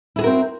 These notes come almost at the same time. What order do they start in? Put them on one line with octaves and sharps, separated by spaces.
E4 G#4 F#4 A#4 C4